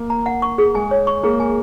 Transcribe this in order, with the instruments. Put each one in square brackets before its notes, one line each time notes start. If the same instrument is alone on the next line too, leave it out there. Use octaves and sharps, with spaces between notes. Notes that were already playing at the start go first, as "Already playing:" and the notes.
Already playing: [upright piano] A#3
[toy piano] A#5
F#5
C#6
G#4
[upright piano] G#3 [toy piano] G#5
[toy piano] C#5
C#6
[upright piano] A#3 [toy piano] G#4
[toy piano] G#5